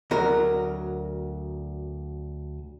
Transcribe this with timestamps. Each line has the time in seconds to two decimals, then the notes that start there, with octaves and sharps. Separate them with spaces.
0.11 D2 F#3 A#4